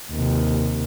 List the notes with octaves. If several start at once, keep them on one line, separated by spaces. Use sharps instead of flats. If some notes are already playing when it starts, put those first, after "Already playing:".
D#2 C3